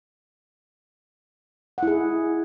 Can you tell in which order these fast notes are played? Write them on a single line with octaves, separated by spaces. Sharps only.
F#5 E4 G#4